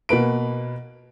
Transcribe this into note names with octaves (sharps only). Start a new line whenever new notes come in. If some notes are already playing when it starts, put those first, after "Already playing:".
B2 A#3 B4 D7